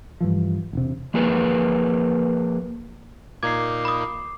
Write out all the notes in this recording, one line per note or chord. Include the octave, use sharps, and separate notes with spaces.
G2 E3 F3
E1 C3
F3 A#3 G#4 A#4 B4
A#2 A#3 D#4 D6 G#6 C7
B5 D#6